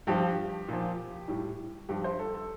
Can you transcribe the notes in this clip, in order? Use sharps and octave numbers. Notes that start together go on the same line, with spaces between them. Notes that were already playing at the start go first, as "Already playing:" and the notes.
G2 F3 G4
A#2 F3
A2 G3
G2 F3 G4
C5
A4
A4